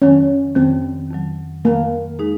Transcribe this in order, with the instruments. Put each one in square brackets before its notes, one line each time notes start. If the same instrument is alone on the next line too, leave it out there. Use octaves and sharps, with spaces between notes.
[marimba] F2 D#3 F#3 [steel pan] C#4
[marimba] F2 D#3 F#3 [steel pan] C4
[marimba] F2 D#3 F#3
[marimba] F2 D#3 F#3 [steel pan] A#3
[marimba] D#3 G#3 D#4 G#4